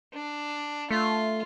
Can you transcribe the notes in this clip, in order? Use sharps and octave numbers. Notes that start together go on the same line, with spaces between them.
D4
A3 F4